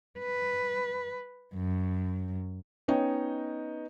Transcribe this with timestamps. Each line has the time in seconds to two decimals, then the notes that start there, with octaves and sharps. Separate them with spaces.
0.19 B4
1.54 F#2
2.88 B3 C#4 D#4 C#5 D#5 G5